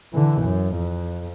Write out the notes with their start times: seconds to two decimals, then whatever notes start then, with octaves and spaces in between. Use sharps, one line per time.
0.13 D3 E3
0.42 F#2
0.75 F2